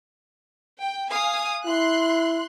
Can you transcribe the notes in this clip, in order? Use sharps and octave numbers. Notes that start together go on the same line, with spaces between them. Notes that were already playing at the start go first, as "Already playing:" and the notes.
G5
F5 G#5 D#6
E4 C6 F#6